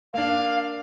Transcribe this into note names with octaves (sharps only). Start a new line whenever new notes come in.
A#3 D4 F5